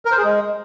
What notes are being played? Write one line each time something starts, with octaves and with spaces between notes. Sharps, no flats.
A#4
C5
G#4
G#3